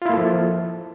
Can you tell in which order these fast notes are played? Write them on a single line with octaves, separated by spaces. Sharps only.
F4 E4 A#3 A4 F3